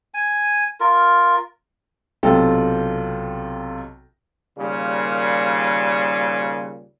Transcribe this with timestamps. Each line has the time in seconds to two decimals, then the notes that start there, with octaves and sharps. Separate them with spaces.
0.14 G#5
0.80 F4 A#4
2.23 B1 C3 F4 A4 G5
4.58 D#2 A#2 C#3 G3